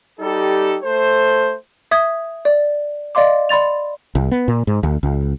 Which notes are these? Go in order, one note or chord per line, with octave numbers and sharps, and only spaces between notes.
G3 D#4 G4 A4
A3 A4 C5
E5 D#6 G#6
D5
D5 D#5 F5 C6 D6
D5 B5 C6 A6 F7
C2
B3
A#2
G#2
D2
C#2